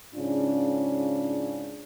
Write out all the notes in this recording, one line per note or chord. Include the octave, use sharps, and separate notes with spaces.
G#2 C#3 C#4 D4 F4